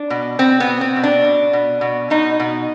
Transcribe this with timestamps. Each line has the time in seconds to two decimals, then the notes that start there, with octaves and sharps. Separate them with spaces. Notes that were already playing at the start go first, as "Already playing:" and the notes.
Already playing: D4
0.10 B2
0.39 B2 C4
0.60 B3
0.66 B2
0.81 C4
0.96 B2
1.04 D4
1.24 B2
1.53 B2
1.81 B2
2.10 B2 D#4
2.40 B2